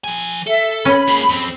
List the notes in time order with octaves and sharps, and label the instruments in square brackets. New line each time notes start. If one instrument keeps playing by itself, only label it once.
[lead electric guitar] F3 G#5
[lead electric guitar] A4 [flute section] E5
[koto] C#4 [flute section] B5
[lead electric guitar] G#3 A#3
F2 C4